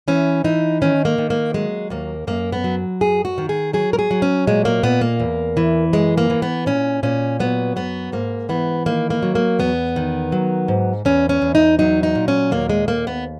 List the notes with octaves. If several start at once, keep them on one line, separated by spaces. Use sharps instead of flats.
E3 C#4
E3 D#4
D#3 C#4
A#3
D#3
A#3
F#3 G#3
D#2 A#3
F#2 A#3
B3
F#3
F#2 G#4
F#4
D#3
G#4
F#3 G#4
A#4
G#4
F#3
C#4
A#2 G#3
A#3
A#2 B3
A#3
E2
E3
F#2 G#3
A#3
E3
B3
A#2 C#4
A#2 C#4
F#3 B3
F#2 B3
G#2 A#3
E3 B3
D#3 A#3
A#3
F#3
A#3
E2 B3
D#3
F#3
G#2
E2 C#4
C#4
E2
D#4
F#3 D#4
D#4
A#2
C#4
D#2 A#3
G#3
D#2 A#3
B3